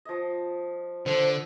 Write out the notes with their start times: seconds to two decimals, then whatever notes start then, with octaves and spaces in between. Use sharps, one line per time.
0.05 F3 D#5
1.06 D3 C5